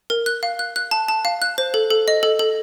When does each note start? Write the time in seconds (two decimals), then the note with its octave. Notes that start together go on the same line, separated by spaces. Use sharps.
0.10 A#4
0.26 F#6
0.43 F5
0.59 F#6
0.76 F#6
0.91 A5
1.08 A5
1.25 F5
1.42 F#6
1.58 C5
1.74 A4
1.90 A4
2.08 D#5
2.23 A4
2.39 A4